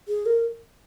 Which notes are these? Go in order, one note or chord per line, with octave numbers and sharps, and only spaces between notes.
G#4
A#4